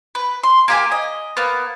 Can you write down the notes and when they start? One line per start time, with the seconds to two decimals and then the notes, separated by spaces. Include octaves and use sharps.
0.15 B4
0.44 C6
0.68 A#3 G4 G#5
0.92 D#5
1.37 A#3 B3